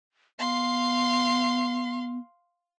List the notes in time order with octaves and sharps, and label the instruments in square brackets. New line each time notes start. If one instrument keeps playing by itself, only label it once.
[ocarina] B3 [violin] F5 C6